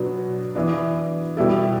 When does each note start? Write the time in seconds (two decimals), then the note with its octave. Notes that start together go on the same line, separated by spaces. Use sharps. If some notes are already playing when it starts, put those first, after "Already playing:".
Already playing: B2 F#3 B3 D4
0.55 E3 B3 D4
1.37 B2 G3 B3 E4 A4